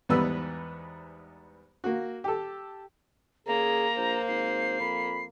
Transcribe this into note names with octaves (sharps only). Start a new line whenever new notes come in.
E2 G#2 G3 B3 B4 E6
A#3 F#4
G4 A4
C#3 A#3 G#4 A#5
A#1 C5
G#1 C7
F2 B5